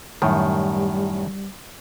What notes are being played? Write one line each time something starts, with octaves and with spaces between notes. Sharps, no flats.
F#2 A2 D#3 G3